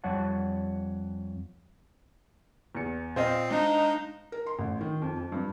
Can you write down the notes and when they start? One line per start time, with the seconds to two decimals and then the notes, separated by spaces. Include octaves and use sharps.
0.04 F2 G3 C#5 F#5 A5
2.75 E2 C#7
3.16 A#2 C4 C5 D#5 F5 C7
3.51 G#3 D4 D#4
4.32 A#4
4.46 C6
4.59 A1
4.81 D#3
5.02 F2
5.17 F2
5.32 G2